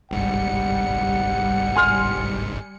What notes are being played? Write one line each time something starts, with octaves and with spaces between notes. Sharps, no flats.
G1 C2 G#2 G3 F#5 C#7
G#5 C6 F6